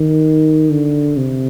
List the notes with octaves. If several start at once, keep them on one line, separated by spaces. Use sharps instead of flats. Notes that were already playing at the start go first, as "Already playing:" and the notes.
Already playing: D#3
D3
C3